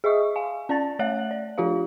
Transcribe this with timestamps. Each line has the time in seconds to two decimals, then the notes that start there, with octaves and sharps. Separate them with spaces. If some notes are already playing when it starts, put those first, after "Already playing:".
0.04 G#4 D#5 E5 C#6 D#6
0.36 F5 G#5
0.69 C#4 D5 A5 A6
0.99 A3 C#5 E5 F#5 F#6 F#7
1.31 D5
1.58 F3 D4 F4 G4 F5